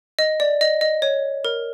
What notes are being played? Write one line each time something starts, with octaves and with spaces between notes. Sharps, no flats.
D#5
D5
D#5
D#5
C#5
A#4